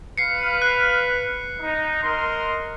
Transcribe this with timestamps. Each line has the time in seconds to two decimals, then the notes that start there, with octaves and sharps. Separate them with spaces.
0.18 B4 F5 C7 C#7
0.62 F#6
1.61 D#4
2.03 A#4 D#5 C6